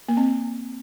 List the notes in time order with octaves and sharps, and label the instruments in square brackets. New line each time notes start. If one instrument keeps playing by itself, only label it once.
[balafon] A#3
C4